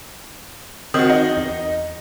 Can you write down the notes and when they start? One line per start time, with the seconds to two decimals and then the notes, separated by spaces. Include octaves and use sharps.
0.94 D#3 C4 F#4
1.10 D#4
1.37 E2